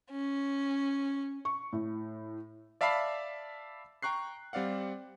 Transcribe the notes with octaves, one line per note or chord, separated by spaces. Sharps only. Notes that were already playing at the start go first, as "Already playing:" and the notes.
C#4
C#6
A2
D5 E5 F5 A5 B5 C7
G5 A#5 C#6 F#6 C7
G3 C4 D5 F5 F#5